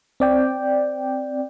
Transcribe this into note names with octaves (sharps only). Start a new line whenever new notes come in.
C4 D5 G5